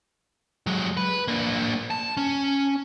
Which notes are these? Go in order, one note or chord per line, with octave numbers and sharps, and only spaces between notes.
F#3 G#3
B4
A#3 D4
A5
C#4